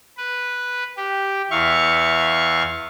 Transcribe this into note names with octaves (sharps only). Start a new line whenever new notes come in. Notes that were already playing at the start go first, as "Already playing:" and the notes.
B4
G4
E2 E5 F5 C#6